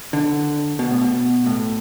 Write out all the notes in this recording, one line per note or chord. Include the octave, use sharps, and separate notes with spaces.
D3
B2
A2
B2
A2